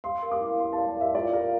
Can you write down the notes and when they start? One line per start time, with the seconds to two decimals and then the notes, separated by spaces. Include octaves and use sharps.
0.04 F5 C6
0.22 A#4
0.31 D6
0.40 E4
0.59 F5 C6
0.73 A5
0.78 D5
0.96 A#4 E5
1.15 F4 D5
1.33 A#4 F5